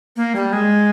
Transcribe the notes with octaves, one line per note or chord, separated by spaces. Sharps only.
A#3
G3
G#3